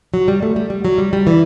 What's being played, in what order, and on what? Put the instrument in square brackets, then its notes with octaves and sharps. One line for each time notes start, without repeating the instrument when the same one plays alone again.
[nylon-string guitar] F#3
G3
A3
G3
G3
F#3
G3
G3
E3